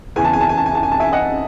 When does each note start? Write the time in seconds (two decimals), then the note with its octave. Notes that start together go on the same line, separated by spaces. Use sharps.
0.16 E2 C#3 E3 G#5
0.25 A5
0.33 G#5
0.41 A5
0.49 G#5
0.57 A5
0.66 G#5
0.75 A5
0.83 G#5
0.92 A5
1.00 E5 G#5
1.13 D#5 F#5